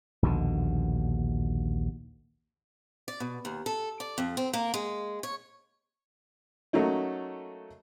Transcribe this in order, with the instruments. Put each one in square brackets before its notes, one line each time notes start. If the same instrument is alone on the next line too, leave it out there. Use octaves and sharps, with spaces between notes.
[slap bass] A#1 D#2 B2 D3
[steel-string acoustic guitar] D5
B2
D#2
A4
D5
F2
C4
A#3
G#3
C#5
[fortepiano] F#3 A3 A#3 C#4 D#4